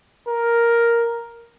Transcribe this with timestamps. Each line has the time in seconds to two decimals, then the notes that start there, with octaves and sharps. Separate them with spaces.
0.28 A#4